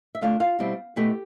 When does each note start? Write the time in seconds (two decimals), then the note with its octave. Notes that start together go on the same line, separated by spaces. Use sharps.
0.15 E5
0.21 D3 A3 D4 F4 F5
0.40 F4 F5
0.59 B2 G3 C4 E4
0.96 B2 A3 E4 G4 G5